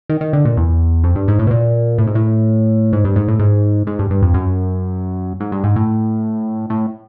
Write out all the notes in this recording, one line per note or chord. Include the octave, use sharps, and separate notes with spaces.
D#3
D#3
D3
A#2
E2
F2
G2
G#2
A2
B2
A#2
A2
G#2
A2
G#2
G2
G#2
A2
G#2
G#2
G2
G2
F2
F#2
G#2
G2
G#2
A2
A2